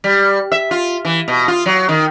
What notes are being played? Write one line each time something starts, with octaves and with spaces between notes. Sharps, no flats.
G3
E5
F4
E3
B2
F4
F#3
D#3